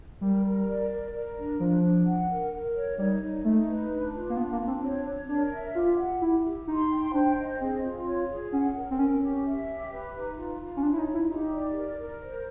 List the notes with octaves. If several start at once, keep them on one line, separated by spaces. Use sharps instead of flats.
G3 A#4
A#4
D5
A#4
A#4
D4
F3 D4
D4
F#5
A#4
A#4
C#5
G3 D#4
D#4
A3 D#4
B4
D4
F4
A#3
B3 D4
A#3
D4
C4
C4 C#5
C#5
D4 A#4
E5
F4 G4
F#5
E4 G4
G4
D#4 C6
G5
D4 C5
D#5
C4 G#4
F4
C#5
G#4
C#4 F#5
A#4
C4
C#4 A#4
G4
E5
G4
B4
D#4
F4
F4
C#4
D4 C#5
E4
D#4
F4
E4
D#4 G4
D5
A#4
A#4
C5